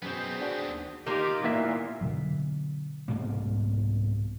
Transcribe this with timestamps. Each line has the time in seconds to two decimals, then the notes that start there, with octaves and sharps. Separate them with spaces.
0.02 F#2 B2 B3 C4 G#4 G5
0.40 D4 F#4
0.62 D#2
1.07 D#3 A#3 F4 G4
1.44 A#2 B3 E4 E5
2.01 B2 D3 F#3
3.08 C2 G#2 B2 A#3